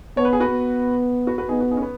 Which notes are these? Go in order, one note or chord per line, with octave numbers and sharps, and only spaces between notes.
B3 C#5
B4
G#4
F#4 B4
B3
F#4 B4
F#4 B4
B3 D#4 G#4
F#4 B4
D#4 G#4
C#4
B3